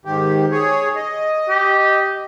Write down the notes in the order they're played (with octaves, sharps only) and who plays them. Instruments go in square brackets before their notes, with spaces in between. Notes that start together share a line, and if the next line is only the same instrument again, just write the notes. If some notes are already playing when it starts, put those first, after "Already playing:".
[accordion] G#2 D#3 G4
G#4 C#5
D#5
[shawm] G4